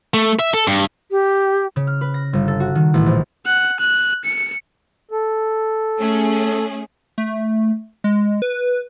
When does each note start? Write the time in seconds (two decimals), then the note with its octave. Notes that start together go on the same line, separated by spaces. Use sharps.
0.14 A3
0.39 E5
0.54 A4
0.68 G2
1.11 G4
1.76 C#3
1.87 F6
2.01 B4
2.14 A#6
2.33 G1
2.48 A4
2.60 F#4
2.75 D#3
2.94 A1
3.06 A#1
3.46 F#5
3.80 F#6
4.25 C#7
5.11 A4
6.00 A3 C#4 G#4
7.18 A3
8.04 G#3
8.42 B4